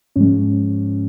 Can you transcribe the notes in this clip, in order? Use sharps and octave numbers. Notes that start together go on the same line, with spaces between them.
G#2 F3 G#3 C#4